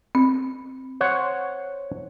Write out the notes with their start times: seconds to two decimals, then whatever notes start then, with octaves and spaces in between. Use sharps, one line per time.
0.15 C4
1.00 C5 C#5 F#5